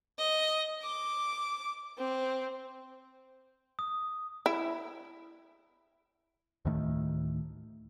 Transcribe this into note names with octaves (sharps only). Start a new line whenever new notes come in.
D#5
D6
C4
D#6
E4
D2 A2 D#3 A3